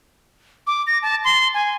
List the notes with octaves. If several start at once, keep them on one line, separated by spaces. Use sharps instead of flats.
D6
A#6
A5
C6
G#5